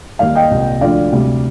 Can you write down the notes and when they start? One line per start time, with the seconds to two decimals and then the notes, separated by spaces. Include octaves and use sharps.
0.19 D#2 D#3 G3 D5 F5
0.35 D#5 G5
0.50 C2 A#2 G3
0.81 D2 D3 F3 D5 F5
1.12 D2 C3 G3